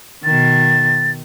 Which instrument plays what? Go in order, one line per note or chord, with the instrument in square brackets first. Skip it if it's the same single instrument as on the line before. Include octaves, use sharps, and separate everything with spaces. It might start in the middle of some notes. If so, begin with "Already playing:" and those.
[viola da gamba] B2 D#3 [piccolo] A6